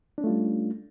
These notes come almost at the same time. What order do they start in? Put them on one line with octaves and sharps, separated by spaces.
D4 C#4 A3 F4 G3